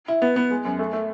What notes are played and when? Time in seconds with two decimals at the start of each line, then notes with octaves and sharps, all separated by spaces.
0.08 E4
0.22 B3
0.36 B3
0.51 G#3
0.65 F#2
0.79 A3
0.93 A3